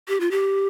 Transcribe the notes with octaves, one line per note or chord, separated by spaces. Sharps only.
G4
F4
G4